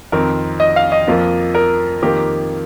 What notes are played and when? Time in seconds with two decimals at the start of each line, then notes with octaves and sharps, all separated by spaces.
0.12 F2 D#3 C4 A#4
0.60 D#5
0.76 F5
0.92 D#5
1.08 F2 F3 A#3 F4
1.55 A#4
2.02 F2 D#3 A#3 F4 G4